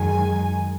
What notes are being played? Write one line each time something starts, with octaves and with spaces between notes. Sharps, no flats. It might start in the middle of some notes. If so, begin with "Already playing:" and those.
Already playing: F#2 D#3 G#3 G#5